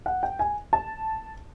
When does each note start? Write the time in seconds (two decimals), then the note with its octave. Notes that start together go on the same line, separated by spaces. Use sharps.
0.06 F#5
0.23 G5
0.39 G#5
0.73 A5